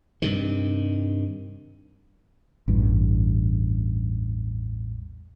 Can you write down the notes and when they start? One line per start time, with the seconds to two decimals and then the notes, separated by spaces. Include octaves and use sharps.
0.22 G2 C3 D#3
2.68 A1 E2 G2